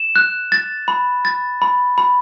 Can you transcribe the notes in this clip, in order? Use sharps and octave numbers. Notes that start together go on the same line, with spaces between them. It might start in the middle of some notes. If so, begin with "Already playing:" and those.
Already playing: E7
F#6
A6
B5
A6
B5
B5